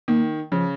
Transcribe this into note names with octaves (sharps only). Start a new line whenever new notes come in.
D#3 A#3
C#3 F3